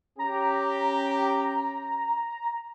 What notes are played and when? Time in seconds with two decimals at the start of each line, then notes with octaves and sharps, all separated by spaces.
0.19 C#4 G4 A#5